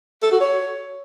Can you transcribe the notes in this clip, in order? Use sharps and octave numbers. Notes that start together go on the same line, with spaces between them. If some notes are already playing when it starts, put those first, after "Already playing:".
A4
F#4
C#5